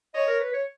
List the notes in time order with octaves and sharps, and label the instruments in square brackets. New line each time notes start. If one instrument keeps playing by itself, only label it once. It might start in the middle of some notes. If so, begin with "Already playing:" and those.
[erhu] C#5 [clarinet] D#5
[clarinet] A#4
B4
C#5